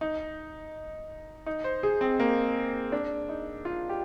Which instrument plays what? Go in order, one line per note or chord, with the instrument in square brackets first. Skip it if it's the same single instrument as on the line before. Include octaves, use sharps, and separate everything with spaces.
[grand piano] D#4
D#4
C5
G#4
C4
A#3
D4
D#4
F4
G4